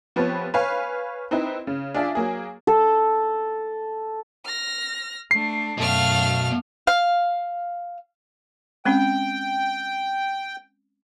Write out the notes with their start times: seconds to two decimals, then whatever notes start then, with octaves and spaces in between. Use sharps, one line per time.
0.16 F3 B3 C4 G4 B4 C#5
0.54 B4 C#5 F5 G#5
1.31 C4 D#4 E4 B4
1.67 C#3
1.94 D4 F4 G#4 D5 E5
2.15 F#3 A#3 G#4
2.67 A4
4.45 F6 A#6
5.31 A3 D4 C7
5.78 F#2 B2 A3 F5 F6
6.87 F5
8.85 G#3 C4 C#4 G5